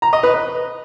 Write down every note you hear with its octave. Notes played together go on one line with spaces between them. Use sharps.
A#5
D#5
B4
B4